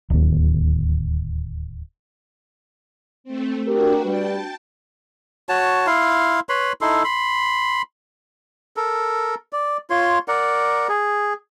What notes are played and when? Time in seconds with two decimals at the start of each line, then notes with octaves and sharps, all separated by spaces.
0.10 D1 D#2
3.24 A3 C4
3.68 D4 F#4 G4 A#4
4.05 G3 B4 G5 A5
5.49 F#4 C#5 A5
5.87 E4 F5 C6
6.49 B4 C#5 B5 C6
6.81 D#4 E4 A4 C6
7.04 B5 C6
8.77 A4 A#4
9.53 D5
9.90 F4 C#5 C6
10.28 A#4 D5 F#5
10.89 G#4